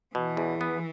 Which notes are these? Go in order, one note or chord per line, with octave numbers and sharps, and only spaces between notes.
B2 E3
E2
B3